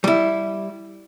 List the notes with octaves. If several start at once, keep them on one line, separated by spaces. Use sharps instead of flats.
G3 E4